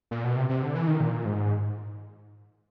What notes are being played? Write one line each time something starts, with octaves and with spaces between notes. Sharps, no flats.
A#2
B2
C3
C3
D3
E3
D#3
A#2
G#2